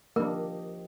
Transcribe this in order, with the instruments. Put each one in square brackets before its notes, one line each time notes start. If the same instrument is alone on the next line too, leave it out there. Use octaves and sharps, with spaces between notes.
[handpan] F3 G4 D#5 [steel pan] A#3 D4 [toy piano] A#4